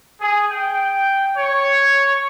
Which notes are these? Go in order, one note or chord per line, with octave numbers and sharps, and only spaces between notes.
G#4
G5
C#5